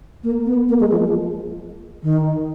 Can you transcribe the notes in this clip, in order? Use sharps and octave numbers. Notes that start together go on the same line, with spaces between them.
A#3
B3
A#3
G#3
F3
D#3